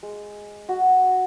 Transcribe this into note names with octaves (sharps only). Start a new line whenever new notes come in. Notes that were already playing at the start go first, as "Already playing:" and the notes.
G#3
F#4